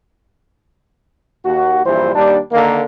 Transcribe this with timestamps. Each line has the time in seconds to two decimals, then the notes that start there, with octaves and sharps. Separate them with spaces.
1.45 D#2 F#4
1.86 A#1 G2 E3 E4 C5
2.15 D#2 G3 D4
2.52 D3 D#3 A#3